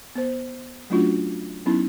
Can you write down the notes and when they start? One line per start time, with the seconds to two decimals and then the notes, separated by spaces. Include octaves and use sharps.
0.15 B3 C5
0.90 F#3 A3 C#4 D4 F4 F#4
1.66 F#3 B3 C#4 D#4 E4